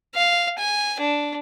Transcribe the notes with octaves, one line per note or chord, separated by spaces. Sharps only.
F5
G#5
D4